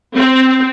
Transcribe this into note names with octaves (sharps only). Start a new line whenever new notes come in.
C4